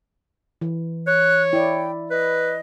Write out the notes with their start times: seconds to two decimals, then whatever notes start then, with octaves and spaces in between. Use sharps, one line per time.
0.61 E3
1.07 C#5 F#6
1.53 E4 D5 G5
2.11 B4 D#5